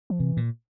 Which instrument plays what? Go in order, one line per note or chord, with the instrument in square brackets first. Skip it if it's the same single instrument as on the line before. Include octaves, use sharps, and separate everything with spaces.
[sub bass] F3
[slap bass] C3 [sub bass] E3
[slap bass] A#2